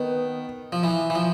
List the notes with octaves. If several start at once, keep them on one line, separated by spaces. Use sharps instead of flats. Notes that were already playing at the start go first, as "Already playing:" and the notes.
Already playing: D#3 B3
F3
E3
E3
F3